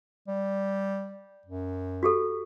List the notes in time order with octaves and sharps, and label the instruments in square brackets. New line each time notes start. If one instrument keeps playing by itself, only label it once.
[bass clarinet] G3
F#2
[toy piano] F#4 G4 A4